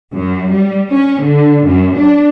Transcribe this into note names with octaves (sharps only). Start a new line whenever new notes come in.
F#2
G3
C#4
D3
F#2
D4